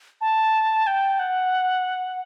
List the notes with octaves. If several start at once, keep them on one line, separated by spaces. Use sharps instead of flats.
A5
G5
F#5